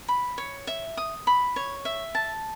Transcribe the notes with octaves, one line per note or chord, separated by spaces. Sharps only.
B5
C#5
E5
D#6
B5
C#5
E5
A5